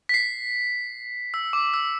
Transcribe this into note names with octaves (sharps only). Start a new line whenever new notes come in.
B6
C7
E6
D6
E6